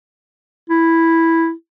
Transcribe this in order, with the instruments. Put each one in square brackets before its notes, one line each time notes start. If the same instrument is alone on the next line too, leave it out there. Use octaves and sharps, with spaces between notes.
[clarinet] E4